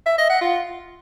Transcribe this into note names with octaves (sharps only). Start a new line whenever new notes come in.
E5
D#5
F#5
F4